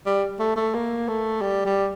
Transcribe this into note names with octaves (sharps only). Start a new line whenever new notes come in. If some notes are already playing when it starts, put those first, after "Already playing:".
G3
A3
A3
A#3
A3
G3
G3